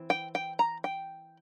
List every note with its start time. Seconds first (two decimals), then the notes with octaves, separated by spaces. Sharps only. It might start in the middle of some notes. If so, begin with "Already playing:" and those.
Already playing: E3 C4
0.10 G5
0.35 G5
0.59 A#5
0.84 G5